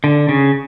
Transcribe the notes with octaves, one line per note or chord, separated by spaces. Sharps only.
D3
C#3